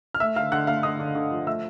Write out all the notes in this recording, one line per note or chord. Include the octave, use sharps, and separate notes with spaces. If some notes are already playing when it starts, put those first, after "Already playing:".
F6
A3 E5 E6
D3 F5 F6
D3 F#5 F#6
A3 F5 F6
D3 D#5 D#6
D3
D3
F3
A3 E5 E6